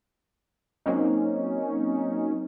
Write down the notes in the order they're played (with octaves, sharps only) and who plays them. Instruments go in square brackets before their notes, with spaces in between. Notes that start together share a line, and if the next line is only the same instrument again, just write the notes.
[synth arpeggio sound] F#3 A#3 C4 C#4 D#4